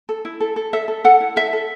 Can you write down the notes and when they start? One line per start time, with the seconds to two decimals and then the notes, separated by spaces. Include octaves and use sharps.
0.09 A4
0.25 E4
0.40 A4
0.56 A4
0.73 A4 E5
0.88 A4
1.04 A4 F#5
1.20 E4
1.36 A4 E5
1.53 A4